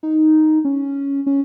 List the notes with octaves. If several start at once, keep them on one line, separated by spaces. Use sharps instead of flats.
D#4
C#4
C#4